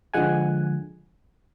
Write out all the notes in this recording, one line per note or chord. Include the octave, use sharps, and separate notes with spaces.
D3 F3 G#3 F#5 G#5